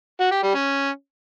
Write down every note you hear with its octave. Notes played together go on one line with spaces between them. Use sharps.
F#4
G4
G3
C#4